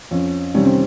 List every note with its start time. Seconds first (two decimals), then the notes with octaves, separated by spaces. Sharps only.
0.11 F2 C#4
0.54 C3 D#3 G3 C#4
0.65 C4